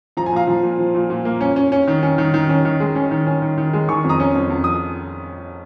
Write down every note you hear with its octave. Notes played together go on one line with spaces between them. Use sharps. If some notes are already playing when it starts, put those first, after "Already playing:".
F3 A#5
G#5
A#2 F5 A#5
F3
A#2
F3
A#2
A#2
A#3
C#4
C#4
C#4
D#3
C#4
D#3
D#3
C#4
D#3
G#3
C#4
D#3
C#4
D#3
D#3
G#3
D#3 G#5 C#6
F2
A#5 D#6
C#4
F2
F2
D#6